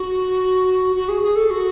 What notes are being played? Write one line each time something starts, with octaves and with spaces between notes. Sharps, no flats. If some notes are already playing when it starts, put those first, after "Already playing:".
Already playing: F#4
F#4
G#4
G#4
A4
F#4